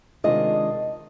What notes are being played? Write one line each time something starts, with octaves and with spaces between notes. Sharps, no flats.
C3 D#3 G#3 D4 F4 D#5